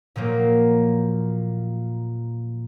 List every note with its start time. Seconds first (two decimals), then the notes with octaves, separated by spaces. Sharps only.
0.16 A#2 F3 F#3 A#3